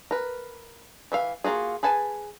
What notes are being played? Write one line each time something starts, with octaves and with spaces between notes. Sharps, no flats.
A#4 B4
E3 E5 F5
A#3 F4 F#4 G#4
G#4 B4 G#5 A5